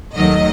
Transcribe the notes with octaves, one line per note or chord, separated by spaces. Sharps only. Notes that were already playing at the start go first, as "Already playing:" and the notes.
D#2 D#3 F#3 A3 D#5